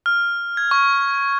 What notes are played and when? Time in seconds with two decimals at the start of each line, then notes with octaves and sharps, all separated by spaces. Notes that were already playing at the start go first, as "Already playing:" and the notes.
0.06 F6
0.57 G#6
0.71 C#6